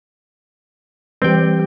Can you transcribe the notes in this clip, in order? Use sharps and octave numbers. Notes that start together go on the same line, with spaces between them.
E3 G3 C4 G4 B4 G5